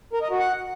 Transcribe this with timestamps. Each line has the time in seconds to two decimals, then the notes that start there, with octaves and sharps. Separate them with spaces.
0.13 A#4
0.22 D#5
0.30 F#4
0.39 F#5